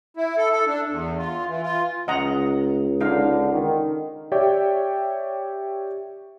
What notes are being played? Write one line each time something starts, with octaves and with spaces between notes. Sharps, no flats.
E4
A4
A4
D4
E2
F4
E3
F4
C#2 D#5 F#5 A#5
D3 D#4 F5
D#3
G4 C#5 D5 E5 G5